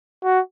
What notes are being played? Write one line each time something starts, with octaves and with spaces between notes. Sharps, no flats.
F#4